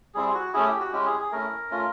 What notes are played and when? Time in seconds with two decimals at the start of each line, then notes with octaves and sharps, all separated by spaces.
0.14 G3 C4 E4 G#4
0.34 F#4
0.54 A3 C#4 E4 G#4
0.67 G4
0.80 F#4
0.93 G#3 C#4 E4 G4
1.06 G#4
1.20 G#4
1.32 A3 C#4 E4 A#4
1.71 A3 C#4 F4